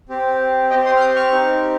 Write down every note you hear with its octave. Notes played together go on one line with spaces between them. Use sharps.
C4 G4
C4 G4 D#5 G5
C6 D#6
F6
D#6 G6
C#6 F6
C4 D#4 G4